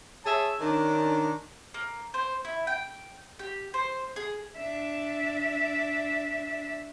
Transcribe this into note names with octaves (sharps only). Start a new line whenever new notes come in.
G#4 C#5 E5 A5
D#3 C#4 D4
A#3
C5
E4
G5
G4
C5
G#4
D4 E5